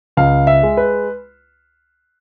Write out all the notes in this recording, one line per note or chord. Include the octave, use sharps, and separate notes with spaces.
C#2 F5
E5
G#3
B4